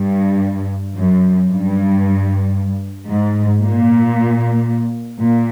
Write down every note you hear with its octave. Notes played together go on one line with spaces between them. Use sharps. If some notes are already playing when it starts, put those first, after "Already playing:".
Already playing: G2
F#2
G2
G#2
A#2
A#2